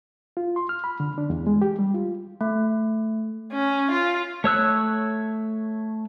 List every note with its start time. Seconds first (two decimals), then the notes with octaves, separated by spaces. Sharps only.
0.37 F4
0.56 C6
0.69 F6
0.84 B5
1.00 D3
1.18 D4
1.30 E2
1.47 G#3
1.62 G4
1.79 G3
1.94 F4
2.41 A3
3.53 C#4
3.91 F4
4.44 A3 C#5 E6 F#6